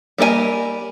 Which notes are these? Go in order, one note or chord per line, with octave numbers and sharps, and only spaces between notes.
G3 A#3 A#4 D#5 G#5